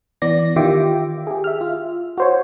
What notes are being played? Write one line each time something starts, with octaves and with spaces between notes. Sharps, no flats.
E3 B3 D5 A#6
D#3 F4 G4 E5 G5 D6
G4 G#4
E5 F6
F4
F#4 C5 C#5